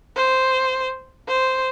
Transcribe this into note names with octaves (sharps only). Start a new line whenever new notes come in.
C5
C5